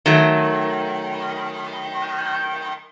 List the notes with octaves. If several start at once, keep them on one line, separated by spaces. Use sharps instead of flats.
D#3 F#3 A3